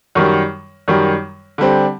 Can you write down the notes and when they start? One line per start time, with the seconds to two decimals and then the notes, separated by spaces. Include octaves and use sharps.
0.15 F#2 D#3 G3
0.88 F#2 D#3 G3
1.58 D3 G3 C4